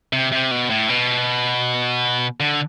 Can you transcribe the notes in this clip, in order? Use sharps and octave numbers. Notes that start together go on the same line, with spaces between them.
C3
C3
B2
A2
B2
D3